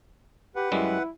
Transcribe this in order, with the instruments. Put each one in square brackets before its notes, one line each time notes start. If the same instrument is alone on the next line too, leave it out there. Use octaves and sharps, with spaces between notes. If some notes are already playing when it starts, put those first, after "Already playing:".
[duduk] G4 [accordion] B4 F#5
[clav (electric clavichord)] F#2 G3 G#3 [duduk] E4